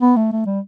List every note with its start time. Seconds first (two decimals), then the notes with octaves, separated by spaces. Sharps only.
0.02 B3
0.16 A3
0.32 A3
0.46 G3